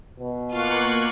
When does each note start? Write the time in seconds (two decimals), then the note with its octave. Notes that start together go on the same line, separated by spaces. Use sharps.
0.20 B2
0.51 A#3 F4 F5 C#6 F#6